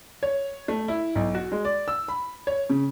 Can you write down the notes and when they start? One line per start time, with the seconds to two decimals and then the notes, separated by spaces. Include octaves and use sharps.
0.23 C#5
0.68 A3
0.88 E4
1.15 B1
1.35 F#4
1.52 G#3
1.65 D5
1.88 E6
2.08 B5
2.47 C#5
2.70 C#3